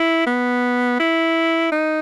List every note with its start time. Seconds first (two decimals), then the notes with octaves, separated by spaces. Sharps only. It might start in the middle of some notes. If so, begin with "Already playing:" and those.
Already playing: E4
0.27 B3
1.00 E4
1.72 D#4